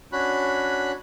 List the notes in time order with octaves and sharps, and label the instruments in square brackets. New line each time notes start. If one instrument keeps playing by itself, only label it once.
[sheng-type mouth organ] C#4 D4 F#4 B5 F#6